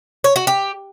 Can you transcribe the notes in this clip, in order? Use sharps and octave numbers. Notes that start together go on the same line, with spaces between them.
C#5
F#4
G4